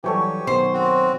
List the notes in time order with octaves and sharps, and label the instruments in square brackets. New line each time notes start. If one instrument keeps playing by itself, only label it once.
[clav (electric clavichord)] E3 F#3 G3 [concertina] G4 [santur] A4 C#5 G#5
[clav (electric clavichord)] B1 D#3 B3 [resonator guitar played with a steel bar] C5
[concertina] C4 F#4